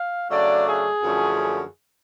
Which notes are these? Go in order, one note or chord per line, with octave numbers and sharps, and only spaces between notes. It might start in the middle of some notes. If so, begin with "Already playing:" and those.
Already playing: F5
C#3 F#3 A3 D4 D5
G#4
F#2 D3 F3 A3 C#4